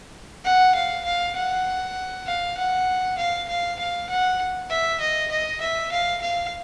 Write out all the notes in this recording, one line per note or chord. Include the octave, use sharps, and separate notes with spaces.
F#5
F5
F5
F#5
F5
F#5
F5
F5
F5
F#5
E5
D#5
D#5
E5
F5
F5